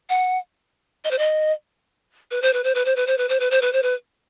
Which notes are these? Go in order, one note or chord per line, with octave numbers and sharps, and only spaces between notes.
F#5
D#5
C5
D#5
B4
C5
B4
C5
B4
C5
B4
C5
B4
C5
B4
C5
B4
C5
B4